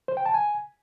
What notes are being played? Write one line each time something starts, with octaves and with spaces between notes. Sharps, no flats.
C5
G5
A5
G#5